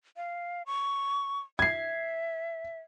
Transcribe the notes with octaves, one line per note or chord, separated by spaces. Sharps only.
F5
C#6
E5 G#6 C7